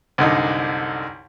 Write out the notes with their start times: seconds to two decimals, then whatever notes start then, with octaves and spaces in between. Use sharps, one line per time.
0.18 C2 F#2 D3 D#4